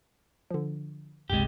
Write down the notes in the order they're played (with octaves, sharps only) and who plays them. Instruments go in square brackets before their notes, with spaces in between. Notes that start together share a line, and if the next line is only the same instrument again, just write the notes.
[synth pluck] D3 F3
[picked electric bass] G1 C#2 C3 [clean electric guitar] G#3 G4